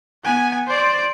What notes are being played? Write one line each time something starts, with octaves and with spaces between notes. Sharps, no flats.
B3 G#5
C5 D5